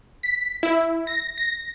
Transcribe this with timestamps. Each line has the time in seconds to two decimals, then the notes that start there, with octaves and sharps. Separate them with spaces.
0.23 B6
0.63 E4
1.07 A#6
1.38 A#6